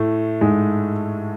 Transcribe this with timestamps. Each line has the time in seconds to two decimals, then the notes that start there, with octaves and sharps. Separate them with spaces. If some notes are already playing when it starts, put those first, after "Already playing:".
Already playing: A2 A3
0.41 G#2 G#3